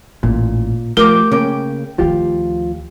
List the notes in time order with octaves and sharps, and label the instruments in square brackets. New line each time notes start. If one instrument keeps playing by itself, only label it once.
[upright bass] A1 [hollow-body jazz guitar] A#2
[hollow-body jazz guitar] F3 [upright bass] A3 [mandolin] G4 D6 [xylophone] A#4
[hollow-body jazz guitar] C#3 A#3 C#4 [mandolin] G5
[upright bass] D2 D#3 [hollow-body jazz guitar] F3 F4 G4